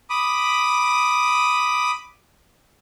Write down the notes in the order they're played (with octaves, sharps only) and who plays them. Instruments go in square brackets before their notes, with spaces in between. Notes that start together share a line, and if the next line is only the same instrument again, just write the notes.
[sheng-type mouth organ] B5 D6 D#6